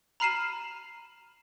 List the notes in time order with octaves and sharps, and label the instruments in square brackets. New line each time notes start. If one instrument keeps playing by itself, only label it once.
[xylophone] A#5 B5 F6 C7 D#7 E7